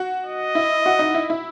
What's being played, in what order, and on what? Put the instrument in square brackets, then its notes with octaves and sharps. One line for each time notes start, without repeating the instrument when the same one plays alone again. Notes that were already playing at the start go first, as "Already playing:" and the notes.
Already playing: [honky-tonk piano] F#4
[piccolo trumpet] D#5
[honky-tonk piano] E4
F#4
D#4
E4
E4